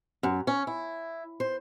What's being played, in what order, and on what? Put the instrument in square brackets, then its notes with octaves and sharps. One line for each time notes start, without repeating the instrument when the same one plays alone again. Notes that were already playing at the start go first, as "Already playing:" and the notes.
[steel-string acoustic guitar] F#2
C#4
E4
C5